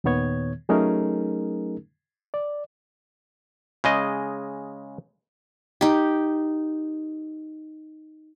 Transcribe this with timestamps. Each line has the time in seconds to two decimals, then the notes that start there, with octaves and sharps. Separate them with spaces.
0.04 D#2 A#2 D#3 B3 C#5 G#6
0.69 F#3 A3 C#4 D#4 G#4 A#4
2.34 D5
3.84 C#3 G#3 D#5
5.81 D#4 G4